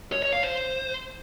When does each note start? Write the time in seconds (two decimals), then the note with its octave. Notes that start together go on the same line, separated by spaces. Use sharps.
0.12 C#5
0.23 C#5
0.33 F5
0.43 C5